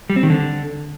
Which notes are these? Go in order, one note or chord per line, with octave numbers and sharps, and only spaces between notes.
G3
C4
D#3
D3